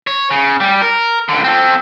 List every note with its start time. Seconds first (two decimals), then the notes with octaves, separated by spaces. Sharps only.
0.07 C#5
0.30 C#3
0.60 G3
0.82 A#4
1.29 C#2 D3
1.44 C4 A4